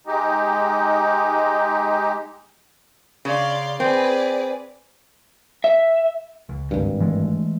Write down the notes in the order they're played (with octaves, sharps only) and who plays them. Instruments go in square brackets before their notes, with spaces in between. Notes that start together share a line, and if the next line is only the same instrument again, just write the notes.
[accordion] G#3 D#4 G4
[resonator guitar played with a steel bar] C#3 [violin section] D5 F5 C6
[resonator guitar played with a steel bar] C4 [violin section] G#4 B4 D5
[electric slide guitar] E5
[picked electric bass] C#2
[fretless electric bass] G#1 G2
[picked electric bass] E3 G#3 A3